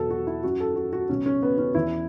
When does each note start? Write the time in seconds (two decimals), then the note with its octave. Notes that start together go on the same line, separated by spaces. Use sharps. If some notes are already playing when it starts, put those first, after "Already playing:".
Already playing: E2 B2 F#3 F#4 A4
0.10 F#4
0.27 E4
0.43 F#2 F#3 F#4
0.60 A4
0.76 F#4
0.93 F#4
1.09 C#2 B2 F#3 C#4
1.26 C#4
1.43 B3
1.58 C#4
1.75 E2 E3 E4